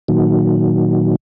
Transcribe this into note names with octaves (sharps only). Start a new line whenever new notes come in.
A#2 D#3 F#3